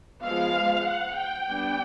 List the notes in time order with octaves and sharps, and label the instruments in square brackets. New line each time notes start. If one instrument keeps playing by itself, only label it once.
[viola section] F3 G#3 B3 F5
F#5
G5
G3 B3 D4